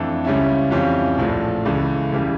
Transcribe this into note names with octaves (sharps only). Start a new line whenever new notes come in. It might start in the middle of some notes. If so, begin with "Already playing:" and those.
Already playing: F2 E3 A3 D4 A4
C#2 C#3 G3 C#4 E4
F2 E3 G3 C#4 F4
A#1 A2 F3
C#2 C#3 E3 A3
E1 C#3 E3 G3